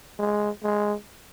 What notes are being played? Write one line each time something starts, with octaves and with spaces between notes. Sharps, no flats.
G#3
G#3